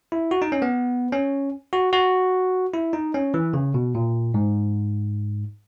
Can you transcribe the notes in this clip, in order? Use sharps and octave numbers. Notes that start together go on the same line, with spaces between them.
E4
F#4
D#4
C#4
B3
C#4
F#4
F#4
E4
D#4
C#4
E3
C#3
B2
A#2
G#2